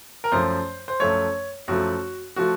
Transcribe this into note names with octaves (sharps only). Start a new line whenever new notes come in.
A#4
F#2 F3 A3 C5
C5
F#2 F3 A3 C#5
F#2 F3 A3 F#4
F3 A3 F#4